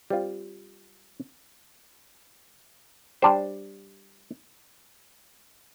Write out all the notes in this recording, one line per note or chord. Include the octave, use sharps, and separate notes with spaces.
G3 C4 F4
G3 D4 G4 C5